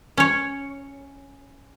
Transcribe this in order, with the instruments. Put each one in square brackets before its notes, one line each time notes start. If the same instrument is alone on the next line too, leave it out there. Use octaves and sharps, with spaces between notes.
[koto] C#4 C#5